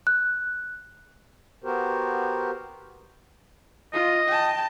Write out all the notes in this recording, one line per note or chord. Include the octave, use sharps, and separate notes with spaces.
F#6
B3 F#4 G4 A#4 C5
F4 D#5
G5 A5